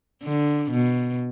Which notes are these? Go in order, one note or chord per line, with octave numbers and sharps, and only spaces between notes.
D3
B2